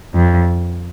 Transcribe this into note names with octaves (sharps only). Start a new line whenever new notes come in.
F2